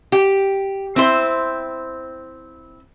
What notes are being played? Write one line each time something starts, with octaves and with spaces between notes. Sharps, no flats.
G4
C4 E4 C5